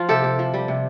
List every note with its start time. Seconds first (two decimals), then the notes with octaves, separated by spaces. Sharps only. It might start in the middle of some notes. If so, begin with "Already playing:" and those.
Already playing: F3 F4
0.09 C3 G4 A4
0.24 C3
0.39 F3
0.54 G3
0.68 C3